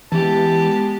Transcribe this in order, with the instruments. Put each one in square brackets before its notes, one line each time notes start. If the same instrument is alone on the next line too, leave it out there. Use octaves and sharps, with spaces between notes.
[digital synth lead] E3 [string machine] G#3 B3 [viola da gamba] G4 [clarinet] A5